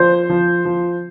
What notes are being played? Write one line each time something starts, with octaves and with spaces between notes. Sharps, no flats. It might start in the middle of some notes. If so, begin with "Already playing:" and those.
Already playing: F3 C5
F3
F3